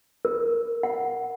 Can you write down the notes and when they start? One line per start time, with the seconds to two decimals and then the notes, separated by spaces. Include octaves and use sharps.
0.25 A#4
0.83 F#5